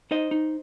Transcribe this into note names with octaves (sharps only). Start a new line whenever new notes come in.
D#4 C5 D#5
D#4